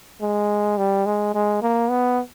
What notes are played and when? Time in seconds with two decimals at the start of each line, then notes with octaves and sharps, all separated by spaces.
0.21 G#3
0.78 G3
1.06 G#3
1.34 G#3
1.62 A#3
1.90 B3